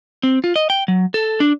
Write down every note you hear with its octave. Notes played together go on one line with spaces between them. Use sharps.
C4
F4
D#5
G5
F#3
A4
D4